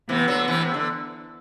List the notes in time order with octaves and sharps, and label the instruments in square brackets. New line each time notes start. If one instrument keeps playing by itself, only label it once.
[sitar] C3 E3 [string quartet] B3
[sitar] D3 F#3
C3 E3
C3
D3